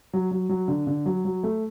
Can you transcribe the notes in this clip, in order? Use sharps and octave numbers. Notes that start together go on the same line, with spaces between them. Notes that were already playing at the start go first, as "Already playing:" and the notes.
F#3
F#3
F#3
D3
D3
F#3
F#3
A3